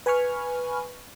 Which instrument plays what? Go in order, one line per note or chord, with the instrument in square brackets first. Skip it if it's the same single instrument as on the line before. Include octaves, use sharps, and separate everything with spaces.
[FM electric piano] B4 G#5 B5 C#6 F6